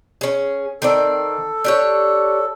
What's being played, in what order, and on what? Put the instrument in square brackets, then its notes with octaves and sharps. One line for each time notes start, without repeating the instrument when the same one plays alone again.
[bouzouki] C#4 G#4
[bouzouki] D#3 C4 D5 [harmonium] A4
[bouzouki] D4 G4 C#5